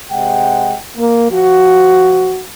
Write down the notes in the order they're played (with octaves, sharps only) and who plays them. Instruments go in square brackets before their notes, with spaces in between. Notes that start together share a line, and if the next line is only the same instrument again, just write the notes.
[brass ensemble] C3 G#3 F#5 G5
A#3
F3 F#4